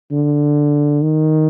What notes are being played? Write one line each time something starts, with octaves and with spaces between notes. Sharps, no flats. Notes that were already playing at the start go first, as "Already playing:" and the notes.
D3
D#3